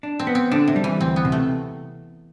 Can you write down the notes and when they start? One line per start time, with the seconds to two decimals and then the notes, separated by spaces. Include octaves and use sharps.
0.03 D4
0.19 C4
0.27 B3
0.35 C4
0.51 D3 D4
0.68 C3
0.76 G3
0.84 E3
1.00 D2 C4
1.16 B3
1.25 C3
1.32 A3